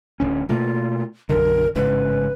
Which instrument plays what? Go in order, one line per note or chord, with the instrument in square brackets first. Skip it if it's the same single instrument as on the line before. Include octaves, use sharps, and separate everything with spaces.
[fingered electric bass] D1 D2 C#4
[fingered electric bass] B2 A3 A#3 [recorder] F4
[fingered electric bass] B1 F#2 D3 [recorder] A#4
[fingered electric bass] A1 G#2 C#3 [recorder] B4